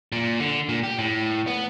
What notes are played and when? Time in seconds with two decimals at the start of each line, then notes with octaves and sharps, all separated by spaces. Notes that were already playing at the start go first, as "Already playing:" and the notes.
0.12 A#2
0.40 D3
0.69 A#2
0.83 G4
0.99 A2
1.47 B3